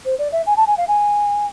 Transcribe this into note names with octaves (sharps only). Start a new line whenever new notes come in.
C5
D5
E5
G#5
A5
G#5
F5
G#5